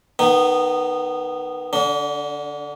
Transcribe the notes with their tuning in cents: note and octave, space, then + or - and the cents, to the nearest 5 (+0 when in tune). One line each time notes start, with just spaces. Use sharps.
D#3 -20 B3 +0 D#4 -20
D3 +0 D4 -40